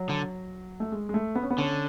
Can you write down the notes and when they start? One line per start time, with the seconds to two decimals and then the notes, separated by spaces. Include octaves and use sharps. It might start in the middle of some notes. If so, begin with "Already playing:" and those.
Already playing: F#3
0.09 D3
0.80 A3
0.92 G#3
1.09 G#3
1.14 A3
1.35 B3
1.43 C#4
1.50 B3
1.58 D3 C#4